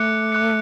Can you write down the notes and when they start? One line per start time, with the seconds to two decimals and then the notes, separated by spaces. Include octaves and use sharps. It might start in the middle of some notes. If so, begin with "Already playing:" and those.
Already playing: A3 D6 F#6 C#7
0.32 D6 F#6 C#7